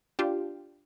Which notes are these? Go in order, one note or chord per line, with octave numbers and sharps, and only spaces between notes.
D4 F4 G4